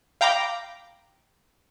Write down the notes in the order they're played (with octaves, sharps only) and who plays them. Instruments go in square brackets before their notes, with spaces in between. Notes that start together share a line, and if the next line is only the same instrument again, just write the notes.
[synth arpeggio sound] F5 G5 A#5 B5 D6